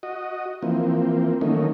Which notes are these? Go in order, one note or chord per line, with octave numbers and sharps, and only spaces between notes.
F#4 D#5
E3 F3 A#3 C4
D#3 F#3 A3 A#3 C#4 D#4